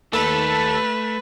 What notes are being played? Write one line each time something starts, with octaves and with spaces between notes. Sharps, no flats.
D#2 A3 A4 B4